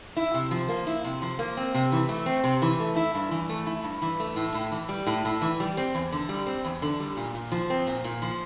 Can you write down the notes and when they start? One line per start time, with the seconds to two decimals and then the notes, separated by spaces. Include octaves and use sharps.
0.17 E4
0.34 C3
0.51 F3
0.69 A#3
0.87 E4
1.04 C3
1.22 F3
1.39 A#3
1.57 C4
1.75 C3
1.92 E3
2.09 A3
2.26 C4
2.44 C3
2.62 E3
2.80 A3
2.96 E4
3.15 G2
3.31 E3
3.49 A3
3.66 E4
3.84 G2
4.02 E3
4.20 A3
4.36 A2
4.54 A2
4.71 E3
4.89 G3
5.07 A2
5.25 A2
5.42 E3
5.60 G3
5.77 C4
5.95 E2
6.12 D3
6.29 G3
6.46 C4
6.64 E2
6.82 D3
7.00 G3
7.17 A#2
7.34 A#2
7.52 F3
7.70 C4
7.87 A#2
8.04 A#2
8.22 F3